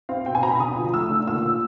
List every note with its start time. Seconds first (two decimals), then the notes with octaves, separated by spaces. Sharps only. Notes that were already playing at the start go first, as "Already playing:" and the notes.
0.09 C4 F5
0.26 B2 G5
0.35 G#5
0.43 B2 A#5
0.51 B5
0.59 D3 D#6
0.77 F3
0.94 A3 E6
1.10 D3
1.27 A#2 E6
1.45 A#2